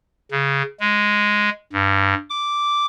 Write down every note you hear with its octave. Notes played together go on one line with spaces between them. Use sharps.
C#3
G#3
G2
D6